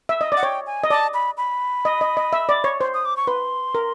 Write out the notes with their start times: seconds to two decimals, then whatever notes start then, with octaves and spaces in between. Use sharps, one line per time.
0.09 E5
0.21 D#5
0.32 D5
0.37 F#5
0.43 C#5 G5
0.67 G#5
0.84 D#5
0.90 D5 A5
1.14 B5
1.37 B5
1.85 D#5
2.01 D#5
2.17 D#5
2.33 E5
2.49 D5
2.64 C#5
2.81 C5
2.94 D#6
3.05 D6
3.17 C#6
3.27 B4 C6
3.75 A#4